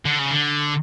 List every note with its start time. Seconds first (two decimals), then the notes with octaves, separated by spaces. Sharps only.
0.05 D3
0.19 C#3
0.31 D3